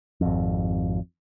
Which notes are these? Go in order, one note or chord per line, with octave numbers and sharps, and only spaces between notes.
G#1 F2